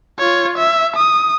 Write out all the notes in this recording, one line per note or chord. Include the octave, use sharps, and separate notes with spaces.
F4 C#5
E5
D#6